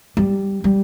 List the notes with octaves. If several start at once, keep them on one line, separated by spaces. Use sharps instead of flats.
G3
G3